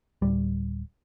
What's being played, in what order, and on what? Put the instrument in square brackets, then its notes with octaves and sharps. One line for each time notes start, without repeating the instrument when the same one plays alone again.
[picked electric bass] D1 G3